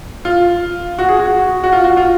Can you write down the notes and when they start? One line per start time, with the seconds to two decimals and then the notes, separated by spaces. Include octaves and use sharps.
0.25 F4
0.99 F#4
1.09 G#4
1.20 F#4
1.64 F#4
1.73 F4
1.84 F#4
1.97 F4